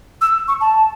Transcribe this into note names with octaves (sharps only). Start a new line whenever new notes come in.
E6
C#6
A5